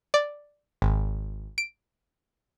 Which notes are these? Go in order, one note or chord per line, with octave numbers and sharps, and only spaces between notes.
D5
G#1
D7